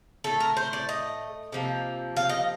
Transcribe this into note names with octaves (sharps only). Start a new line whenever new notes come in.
A2 A3 A4
A#4
C5
D5
D#5
C3 F3 A#3
F5
D#5